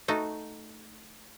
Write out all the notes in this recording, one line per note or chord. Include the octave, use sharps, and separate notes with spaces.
A3 D#4 F#4